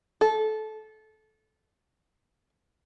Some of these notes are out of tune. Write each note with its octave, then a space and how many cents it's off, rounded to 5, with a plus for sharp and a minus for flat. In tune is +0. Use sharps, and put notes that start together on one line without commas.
A4 -20